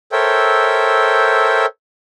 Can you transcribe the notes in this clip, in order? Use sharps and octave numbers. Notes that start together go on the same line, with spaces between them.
A4 A#4 C5 C#5 E5 G5